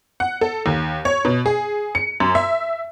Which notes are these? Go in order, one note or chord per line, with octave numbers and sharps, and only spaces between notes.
F#5
A4
D#2
C#5
B2
G#4
C#7
F#2
E5